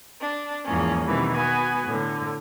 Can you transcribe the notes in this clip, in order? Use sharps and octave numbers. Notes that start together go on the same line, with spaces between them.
D4
E2 G#2 E3 F3 A#3 C#4
B2 D#3 E3 G3 C4
B3 F#4 G#5
A2 D3